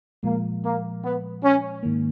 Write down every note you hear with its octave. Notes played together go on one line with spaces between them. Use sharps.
A#2 F3 G#3 A#3
A#3
B3
C#4
G#2 D#3 A#3